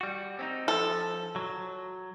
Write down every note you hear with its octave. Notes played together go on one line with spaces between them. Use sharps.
G3 F#4
C4 C#4 D#4
F3 A4
F#3